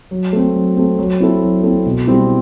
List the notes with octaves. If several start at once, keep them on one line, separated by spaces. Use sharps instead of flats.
F#3
A3 C4
F#3
A3 C4
F#3
C4 E4 A4
F#3
C4 E4 A4
B2
G3 C4 E4